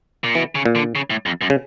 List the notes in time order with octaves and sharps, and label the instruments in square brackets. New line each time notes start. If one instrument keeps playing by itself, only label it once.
[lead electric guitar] A#2
[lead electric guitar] B2 [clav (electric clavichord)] E3
[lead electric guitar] C#3
[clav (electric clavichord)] A#2
[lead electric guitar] D3
C#3
A2
F2
F#2
[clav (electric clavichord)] C#3